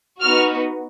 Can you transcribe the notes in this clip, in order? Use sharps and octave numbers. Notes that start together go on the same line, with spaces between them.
B3 D#4 F#4 F6